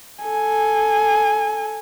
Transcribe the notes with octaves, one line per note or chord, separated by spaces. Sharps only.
A4 G#5